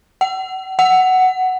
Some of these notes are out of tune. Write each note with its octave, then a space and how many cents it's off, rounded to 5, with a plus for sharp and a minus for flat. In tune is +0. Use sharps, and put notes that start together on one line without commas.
F#5 +40
F#5 +10